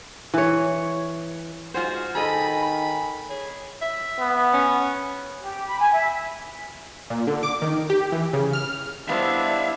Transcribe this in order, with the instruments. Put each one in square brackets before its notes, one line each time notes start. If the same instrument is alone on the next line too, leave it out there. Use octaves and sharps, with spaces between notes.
[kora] E3 C#5
[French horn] G#2 [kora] F4 G#4 C5 [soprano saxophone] F#4
[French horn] D#3 [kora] G#4 A4 D#5 [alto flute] G#5 [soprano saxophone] B5
[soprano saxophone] B5
[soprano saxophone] G#4 [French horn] C#5
[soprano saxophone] E5
[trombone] B3
[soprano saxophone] C#4
[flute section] G4
B5
G#5
E5
[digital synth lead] A#2
D3
D6
D#3
G4
E3
C#3
F6
[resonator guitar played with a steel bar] G3 B3 C5 [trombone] D4 [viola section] E4 [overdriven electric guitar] E5 F5